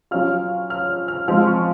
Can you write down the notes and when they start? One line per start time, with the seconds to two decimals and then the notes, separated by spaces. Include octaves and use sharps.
0.11 F#3 C#4 F4 F6
0.70 F6
1.08 F6
1.28 F3 G#3 C4 F6
1.47 C#6